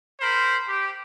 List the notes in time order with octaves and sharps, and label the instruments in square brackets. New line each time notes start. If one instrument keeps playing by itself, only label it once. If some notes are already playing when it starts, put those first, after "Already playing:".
[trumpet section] A#4 C5 B5
G4